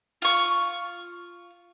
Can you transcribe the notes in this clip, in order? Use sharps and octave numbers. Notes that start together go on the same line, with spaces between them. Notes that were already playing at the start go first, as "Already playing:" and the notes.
F4 C#6